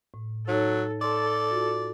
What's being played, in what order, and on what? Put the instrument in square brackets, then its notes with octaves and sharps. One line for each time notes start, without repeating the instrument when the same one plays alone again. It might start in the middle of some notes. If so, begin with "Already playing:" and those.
[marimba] A2
[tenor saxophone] F#3 [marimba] D#4 C#5 [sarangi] A4
[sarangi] A4 [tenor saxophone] D5 [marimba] C6
[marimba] F4 F#4